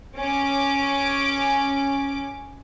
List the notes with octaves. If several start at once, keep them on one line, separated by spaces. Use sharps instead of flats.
C#4 D6